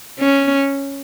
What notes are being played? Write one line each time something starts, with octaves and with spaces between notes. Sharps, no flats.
C#4